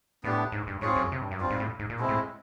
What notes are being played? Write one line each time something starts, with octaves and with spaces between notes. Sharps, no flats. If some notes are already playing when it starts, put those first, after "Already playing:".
A2 B3 D4 G4
G#2
G2
G#2 C4 F4 G#4 C#5
F#2
C3
G2
F#2
G2 G3 C4 F4
G#2
A2
G#2
A#2
B2 G#3 C4 E4
A2